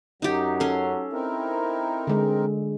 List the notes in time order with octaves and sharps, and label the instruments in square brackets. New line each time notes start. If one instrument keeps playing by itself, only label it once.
[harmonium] F#2 [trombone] F#3 [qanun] D#4 G4
[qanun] C#4 C6 [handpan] A4
[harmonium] C4 D#4 A#4 [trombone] E4
[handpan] D3 G#3